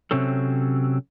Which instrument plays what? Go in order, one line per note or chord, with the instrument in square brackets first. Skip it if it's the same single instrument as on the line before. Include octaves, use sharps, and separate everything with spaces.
[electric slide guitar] C3 F#3 C4 C#4 A4